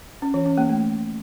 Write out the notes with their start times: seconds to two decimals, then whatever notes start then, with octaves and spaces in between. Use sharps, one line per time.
0.22 C#4
0.34 E3
0.46 C#4
0.58 A#3
0.69 A3